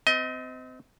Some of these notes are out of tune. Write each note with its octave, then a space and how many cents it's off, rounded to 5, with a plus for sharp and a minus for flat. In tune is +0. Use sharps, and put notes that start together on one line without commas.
C4 -35 D#5 +25